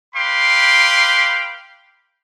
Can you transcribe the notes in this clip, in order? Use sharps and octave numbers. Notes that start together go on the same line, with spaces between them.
B4 F5 G5 B5 C6 D6